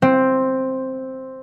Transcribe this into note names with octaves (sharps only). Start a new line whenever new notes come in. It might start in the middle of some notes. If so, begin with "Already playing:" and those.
C4